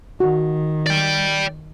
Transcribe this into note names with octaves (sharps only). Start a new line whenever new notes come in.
D#3 F#4
D5 G5